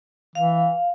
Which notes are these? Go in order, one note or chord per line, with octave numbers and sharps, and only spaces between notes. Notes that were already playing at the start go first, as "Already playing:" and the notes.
E3 F5